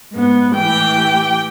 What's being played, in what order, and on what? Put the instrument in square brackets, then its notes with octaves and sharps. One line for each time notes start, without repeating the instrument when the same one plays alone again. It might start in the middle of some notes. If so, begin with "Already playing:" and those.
[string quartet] G#2 B3
[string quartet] A2 E3 [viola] G4 G5